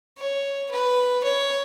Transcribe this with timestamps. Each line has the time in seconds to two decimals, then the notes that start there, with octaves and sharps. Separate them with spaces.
0.18 C#5
0.71 B4
1.23 C#5